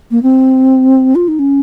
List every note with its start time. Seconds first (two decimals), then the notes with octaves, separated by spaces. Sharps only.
0.11 A#3
0.23 C4
1.15 F4
1.28 D#4
1.39 C#4